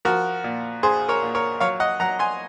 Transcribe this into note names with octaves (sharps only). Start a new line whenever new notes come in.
F3 F#4 A#4
A#2
A#1 G#4 C5
A#4 C#5
A#2
A#4 C#5
F#3 C#5 F5
D#5 F#5
F#3 F#5 A#5
G#5 C6